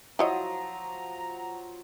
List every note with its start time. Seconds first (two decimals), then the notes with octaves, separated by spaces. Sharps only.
0.19 F3 F#3 E4 C#5 D#5 A#5 D#6